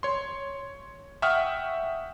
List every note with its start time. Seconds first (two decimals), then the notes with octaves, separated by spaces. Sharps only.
0.03 C#5 C6
1.22 E5 F#5 G5 C#6 D#6 F6